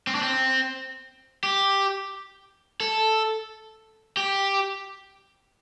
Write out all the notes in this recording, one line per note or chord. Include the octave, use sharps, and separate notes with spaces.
C4
D4
C4
G4
A4
G4